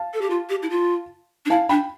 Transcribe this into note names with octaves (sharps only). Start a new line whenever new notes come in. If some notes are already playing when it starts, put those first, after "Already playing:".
Already playing: F5 A5
A4
G4
F4
G4
E4
F4
D4
E4 F5 A5
D4 G5 B5